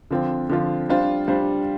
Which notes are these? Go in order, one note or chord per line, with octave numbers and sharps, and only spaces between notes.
D3 F3 C4 F4
D3 F3 C4 F4
G3 D4 F4 C5
G3 D4 F4 C5